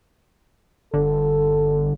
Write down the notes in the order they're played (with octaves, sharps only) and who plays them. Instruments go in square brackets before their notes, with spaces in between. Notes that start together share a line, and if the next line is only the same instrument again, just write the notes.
[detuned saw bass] G1 [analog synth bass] D3 [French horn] A4